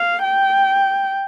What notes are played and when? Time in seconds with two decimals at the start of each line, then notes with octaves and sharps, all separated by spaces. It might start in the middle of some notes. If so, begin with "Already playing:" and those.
Already playing: F5
0.24 G5